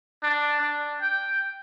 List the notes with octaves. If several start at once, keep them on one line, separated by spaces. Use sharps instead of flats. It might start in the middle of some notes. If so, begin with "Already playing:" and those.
D4
D4
G5